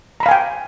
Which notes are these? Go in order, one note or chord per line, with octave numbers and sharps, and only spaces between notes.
F5 G5 G#5 A#5 B5